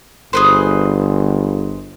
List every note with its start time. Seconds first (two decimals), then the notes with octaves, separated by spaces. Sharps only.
0.33 G1 G#4 B4 C5